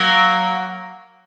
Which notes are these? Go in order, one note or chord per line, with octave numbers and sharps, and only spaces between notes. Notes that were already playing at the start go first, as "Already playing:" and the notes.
Already playing: F#3 A#3